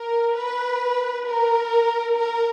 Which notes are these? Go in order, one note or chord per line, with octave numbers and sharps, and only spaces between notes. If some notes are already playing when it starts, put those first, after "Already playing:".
Already playing: A#4
B4
A#4
A#4